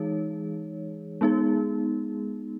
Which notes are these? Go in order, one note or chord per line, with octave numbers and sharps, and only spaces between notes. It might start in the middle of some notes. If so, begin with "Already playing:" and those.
Already playing: E3 G#3 D#4 G#4 C#5
G#3 B3 D#4 G#4